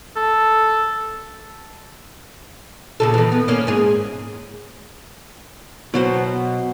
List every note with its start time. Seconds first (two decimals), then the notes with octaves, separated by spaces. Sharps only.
0.16 A4
3.00 A#2 C#3 A4
3.14 D#3 E3
3.32 B3
3.48 A#3 C#4
3.67 G#2 G#4
5.94 B2 F#3 F#4 C5